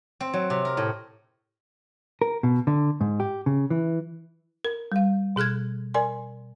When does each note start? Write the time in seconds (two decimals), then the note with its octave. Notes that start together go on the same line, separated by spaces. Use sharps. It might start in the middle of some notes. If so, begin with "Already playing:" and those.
0.21 C4
0.33 F#3
0.50 C3
0.65 A#4
0.77 A2
2.22 A#4
2.43 B2
2.67 D3
3.01 G#2
3.20 G4
3.46 C#3
3.70 E3
4.65 A#4
4.92 G3 F5
5.36 B2 G#4 F6 F#6 G#6
5.94 A#4 D5 G#5 C6